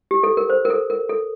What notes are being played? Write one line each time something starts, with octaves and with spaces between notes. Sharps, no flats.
G4
A4
A#4
C5
A#4
A4
A#4
A4